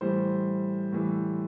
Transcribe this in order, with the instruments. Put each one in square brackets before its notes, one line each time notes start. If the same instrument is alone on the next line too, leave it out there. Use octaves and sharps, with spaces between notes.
[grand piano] A2 E3 G3 C5
A2 E3 G3